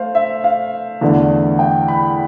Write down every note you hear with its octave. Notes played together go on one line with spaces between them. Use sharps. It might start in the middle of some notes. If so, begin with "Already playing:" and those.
Already playing: A3 C5 F5
E5
F5
E2 D3 A3
G5
B5